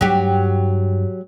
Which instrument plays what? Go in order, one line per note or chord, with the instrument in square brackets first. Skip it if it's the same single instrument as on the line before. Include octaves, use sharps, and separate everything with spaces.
[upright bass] G2 [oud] F#3 G4